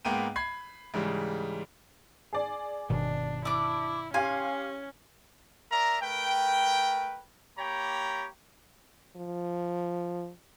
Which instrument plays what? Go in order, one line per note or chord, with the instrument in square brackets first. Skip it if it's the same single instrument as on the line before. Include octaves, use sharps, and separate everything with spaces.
[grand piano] G#2 A#3 B3 G5 D#7
B5 G#6 C7
G#2 C#3 E3 G3
[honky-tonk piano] G#4 D5
[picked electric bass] G1 B2 D#3 [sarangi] D4
[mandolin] D4 D6 [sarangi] E4 [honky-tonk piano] E6
[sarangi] C#4 [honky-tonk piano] G4 F5 C6 [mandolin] G#5
[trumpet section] A#4 D5 E5 A#5
A3 A#4 B4 G5
A#3 G4 C#5 G5 A#5 B5
[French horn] F3